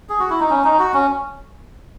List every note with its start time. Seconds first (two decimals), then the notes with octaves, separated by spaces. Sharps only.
0.09 G#4
0.19 F#4
0.30 E4
0.40 D#4
0.50 C#4
0.64 D#4
0.79 F#4
0.94 C#4